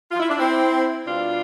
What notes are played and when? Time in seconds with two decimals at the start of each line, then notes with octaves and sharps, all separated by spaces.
0.11 F4
0.20 E4
0.29 D4
0.38 C4 E4
1.06 B2 G3 D4 F4